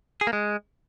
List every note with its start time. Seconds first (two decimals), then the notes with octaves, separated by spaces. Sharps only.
0.21 G#4
0.27 A#3
0.33 G#3